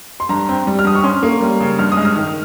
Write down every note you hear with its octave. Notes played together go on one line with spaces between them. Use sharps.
C6
G2 A#5
C4
G3
F6
G2 D#6
C#6
C#4 C6
A#3
G3
C#3
G2 F6
D#6
G#3
F6
D#3